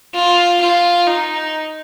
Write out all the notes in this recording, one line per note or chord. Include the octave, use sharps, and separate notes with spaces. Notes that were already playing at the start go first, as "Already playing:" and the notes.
F4
F4
D#4